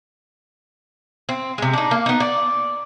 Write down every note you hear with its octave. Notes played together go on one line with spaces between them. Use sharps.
C4
C3 G#3
D4 D#4
A#3
B3 D#4
D5